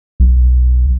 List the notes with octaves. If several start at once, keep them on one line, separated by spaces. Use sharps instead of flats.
B1